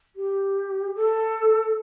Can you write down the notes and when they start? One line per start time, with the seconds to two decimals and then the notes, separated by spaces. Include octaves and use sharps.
0.16 G4
0.95 A4